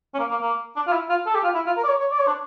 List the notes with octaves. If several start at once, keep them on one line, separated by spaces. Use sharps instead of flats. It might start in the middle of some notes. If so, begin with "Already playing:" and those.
C#4
A#3
A#3
A#3
D4
F4
E4
F4
A4
G4
F4
E4
F4
A#4
D5
C#5
C#5
D5
C#5
D4